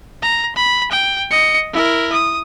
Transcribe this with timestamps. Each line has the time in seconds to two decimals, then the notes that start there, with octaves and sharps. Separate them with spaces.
0.22 A#5
0.56 B5
0.91 G5
1.31 D#5 C#7
1.73 E4 A#4
2.12 D#6